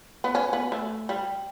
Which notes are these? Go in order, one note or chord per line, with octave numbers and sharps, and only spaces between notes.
B3
C#4
B3
A3
G3